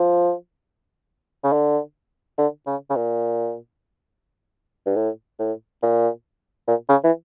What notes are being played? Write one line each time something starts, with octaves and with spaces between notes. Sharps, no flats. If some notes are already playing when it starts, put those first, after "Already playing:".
Already playing: F3
C#3
D3
D3
C#3
C#3
A#2
G2
A2
A2
A#2
A#2
C#3
E3